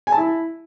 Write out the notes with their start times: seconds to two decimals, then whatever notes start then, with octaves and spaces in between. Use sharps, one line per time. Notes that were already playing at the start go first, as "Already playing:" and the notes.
0.07 G#5
0.12 A5
0.18 E4